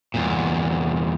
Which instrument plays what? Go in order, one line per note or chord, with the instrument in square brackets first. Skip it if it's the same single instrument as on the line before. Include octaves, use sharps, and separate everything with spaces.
[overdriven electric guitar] E2 A#2